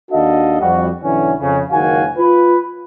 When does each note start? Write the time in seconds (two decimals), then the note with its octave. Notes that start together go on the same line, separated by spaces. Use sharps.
0.11 D#2 D4 F#4 A4 D#5 F5
0.60 F2 G3 F#4
1.03 B1 D3 E3 C#4
1.40 F2 C#3
1.70 F#1 C#2 D#3 F#4 F5 G#5
2.18 F4 B4